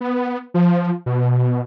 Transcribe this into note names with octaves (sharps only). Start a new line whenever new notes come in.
B3
F3
B2